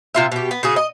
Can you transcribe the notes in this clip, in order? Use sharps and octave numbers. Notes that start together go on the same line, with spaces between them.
C3 F4 E5
B2 G4
B3
C#3 F#4 G#4
D#5